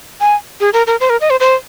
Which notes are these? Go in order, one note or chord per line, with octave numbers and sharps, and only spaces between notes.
G#5
G#4
A#4
A#4
C5
A#4
D#5
C5
C5